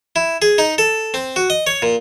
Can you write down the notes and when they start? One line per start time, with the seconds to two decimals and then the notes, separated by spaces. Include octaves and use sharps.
0.16 E4
0.42 G#4
0.58 D#4
0.78 A4
1.14 C4
1.36 F#4
1.50 D#5
1.67 C#5
1.82 A#2